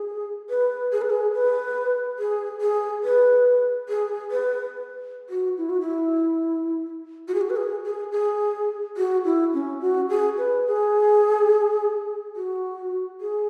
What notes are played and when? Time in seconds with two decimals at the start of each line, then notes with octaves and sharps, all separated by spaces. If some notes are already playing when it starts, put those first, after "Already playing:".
Already playing: G#4
0.50 B4
0.92 G#4
1.02 B4
1.10 G#4
1.34 B4
2.19 G#4
2.61 G#4
3.04 B4
3.89 G#4
4.31 B4
5.30 F#4
5.58 E4
5.70 F#4
5.81 E4
7.28 F#4
7.34 G#4
7.41 F#4
7.50 B4
7.56 G#4
7.85 G#4
8.12 G#4
8.97 F#4
9.25 E4
9.54 C#4
9.81 F#4
10.10 G#4
10.38 B4
10.67 G#4
12.36 F#4
13.21 G#4